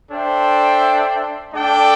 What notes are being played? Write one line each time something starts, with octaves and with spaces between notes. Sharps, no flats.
D4 A4 C5 E5 G5
A3 D4 A4 D5 G5